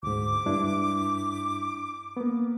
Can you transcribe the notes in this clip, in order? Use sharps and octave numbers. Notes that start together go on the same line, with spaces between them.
D2 G#2 D6
G2 D4 E4
A#3 B3